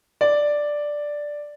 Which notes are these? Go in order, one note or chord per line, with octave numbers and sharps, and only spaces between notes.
D5